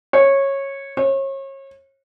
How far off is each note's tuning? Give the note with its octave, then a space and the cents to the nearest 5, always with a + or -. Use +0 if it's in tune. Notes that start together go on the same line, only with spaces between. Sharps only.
C#5 -15
C#5 -35